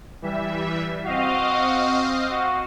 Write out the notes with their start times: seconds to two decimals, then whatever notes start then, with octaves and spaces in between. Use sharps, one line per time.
0.22 E3 G3 E5
1.05 C4 F#4 D#5 F5
2.31 F#4